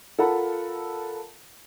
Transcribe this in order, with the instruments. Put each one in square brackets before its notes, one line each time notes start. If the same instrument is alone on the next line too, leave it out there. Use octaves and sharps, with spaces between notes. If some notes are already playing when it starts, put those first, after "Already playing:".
[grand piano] F4 A4 A#4 F#5 A5 B5